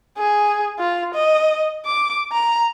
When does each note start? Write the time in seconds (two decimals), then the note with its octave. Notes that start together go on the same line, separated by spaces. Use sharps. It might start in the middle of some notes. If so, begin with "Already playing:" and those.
0.18 G#4
0.79 F4
1.14 D#5
1.86 D6
2.32 A#5